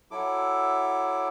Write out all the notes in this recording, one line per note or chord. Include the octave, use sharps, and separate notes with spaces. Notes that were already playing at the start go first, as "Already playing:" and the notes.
F#3 E4 A4 D6